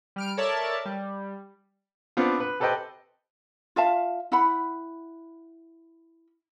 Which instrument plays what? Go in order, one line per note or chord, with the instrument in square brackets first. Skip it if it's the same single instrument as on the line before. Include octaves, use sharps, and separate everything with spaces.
[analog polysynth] G3 F6 D7
A4 A#4 C#5 D5 E5 A5
G3
[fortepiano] B3 C4 D4 F4
B4
G4 A4 B4 C5 D#5 G5
[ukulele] F4 E5 F5 A5
E4 F#5 B5